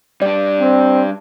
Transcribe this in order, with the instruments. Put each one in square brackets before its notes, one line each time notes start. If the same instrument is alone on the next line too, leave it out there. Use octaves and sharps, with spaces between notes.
[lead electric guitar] G3 D4 [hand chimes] D5
[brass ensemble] C4